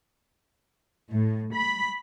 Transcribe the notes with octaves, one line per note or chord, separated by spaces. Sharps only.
A2
B5